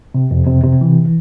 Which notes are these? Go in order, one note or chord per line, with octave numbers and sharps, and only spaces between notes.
C3
F2
C3
C3
E3